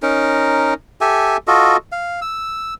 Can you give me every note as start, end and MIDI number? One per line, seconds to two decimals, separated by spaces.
0.02 0.74 61
0.02 0.74 63
0.02 0.74 70
1.01 1.37 67
1.01 1.37 69
1.01 1.37 76
1.01 1.37 80
1.47 1.77 65
1.47 1.77 66
1.47 1.77 69
1.47 1.77 75
1.92 2.20 77
2.21 2.74 88